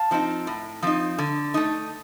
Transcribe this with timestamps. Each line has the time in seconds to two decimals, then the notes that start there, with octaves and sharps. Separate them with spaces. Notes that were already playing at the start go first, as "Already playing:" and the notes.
Already playing: F5 A5
0.11 F3 C4 D#4
0.47 A2
0.82 F3 C4 D#4
1.18 D3
1.54 A3 D#4